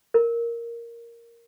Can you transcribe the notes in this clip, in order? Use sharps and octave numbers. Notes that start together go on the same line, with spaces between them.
A#4